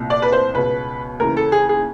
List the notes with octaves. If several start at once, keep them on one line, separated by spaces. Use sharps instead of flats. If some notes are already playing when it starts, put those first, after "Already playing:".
Already playing: C2 A#2
D5
B4
C5
C#2 B2 B4
D#2 C#3 E3 A#4
A4
G#4
G#4